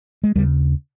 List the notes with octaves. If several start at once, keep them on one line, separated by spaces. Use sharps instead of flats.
G#3
D#2 C#3 G3